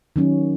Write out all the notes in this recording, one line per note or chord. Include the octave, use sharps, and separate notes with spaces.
D#3 F#3 C#4